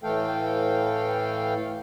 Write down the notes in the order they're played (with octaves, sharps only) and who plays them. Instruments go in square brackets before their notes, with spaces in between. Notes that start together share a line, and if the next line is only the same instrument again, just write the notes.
[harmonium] A2 E3 A3 A4 F5 G5